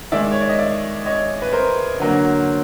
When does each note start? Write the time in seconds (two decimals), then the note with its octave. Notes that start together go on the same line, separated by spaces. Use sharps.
0.12 D#3 G#3 D5 E5
0.31 C#5
0.41 D5
0.49 D#5
0.59 D5 E5
1.05 C#5 D#5
1.42 B4
1.53 A#4 C5
2.00 D3 F#3 A#3